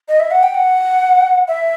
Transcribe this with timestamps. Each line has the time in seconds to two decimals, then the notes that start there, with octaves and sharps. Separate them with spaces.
0.08 D#5
0.20 E5
0.31 F#5
0.43 G5
0.54 F#5
1.48 E5